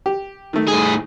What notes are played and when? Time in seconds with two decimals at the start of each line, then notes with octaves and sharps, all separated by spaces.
0.06 G4
0.53 D#3 A3
0.68 A2 G#4